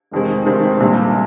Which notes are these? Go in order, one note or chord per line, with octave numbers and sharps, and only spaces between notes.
F1 F2 D#3 G#3 C4
F1 F2 D#3 G#3 C4
A#1 A#2 G3